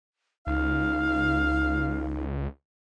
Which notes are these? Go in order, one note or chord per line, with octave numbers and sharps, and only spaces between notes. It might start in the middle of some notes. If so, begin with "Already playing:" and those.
C#2 D#4 F5